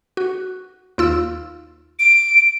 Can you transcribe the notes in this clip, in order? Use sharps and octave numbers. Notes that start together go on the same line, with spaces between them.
F#4
D#2 F4 E6
D7